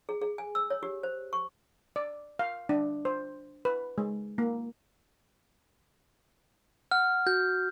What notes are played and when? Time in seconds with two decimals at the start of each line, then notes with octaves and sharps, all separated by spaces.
0.09 G#4
0.22 G#4
0.38 G#5
0.55 E6
0.70 C#5
0.83 G4
1.03 C5
1.33 C#6
1.96 D5
2.39 F5
2.69 D4
3.05 C5
3.65 B4
3.98 G#3
4.38 A#3
6.91 F#5 F6
7.27 F#4 G6